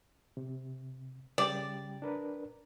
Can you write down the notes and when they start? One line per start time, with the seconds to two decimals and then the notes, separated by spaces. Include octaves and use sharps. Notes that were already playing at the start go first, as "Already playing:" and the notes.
0.37 C3
1.38 C#3 G3 D5 G5
2.02 D4 A#4 B4